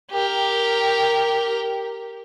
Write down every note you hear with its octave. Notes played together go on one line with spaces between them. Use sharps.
G4 A#4